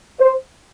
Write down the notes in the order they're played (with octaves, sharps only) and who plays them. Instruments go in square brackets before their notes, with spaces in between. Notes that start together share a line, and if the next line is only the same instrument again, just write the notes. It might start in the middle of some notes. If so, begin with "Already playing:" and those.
[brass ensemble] C5